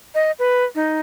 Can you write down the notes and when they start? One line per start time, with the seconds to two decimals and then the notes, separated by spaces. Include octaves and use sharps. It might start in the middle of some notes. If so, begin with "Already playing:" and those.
0.15 D#5
0.39 B4
0.75 D#4